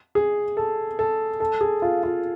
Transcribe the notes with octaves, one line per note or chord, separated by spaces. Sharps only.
G#4
A4
A4
A4
G#4
F4
F4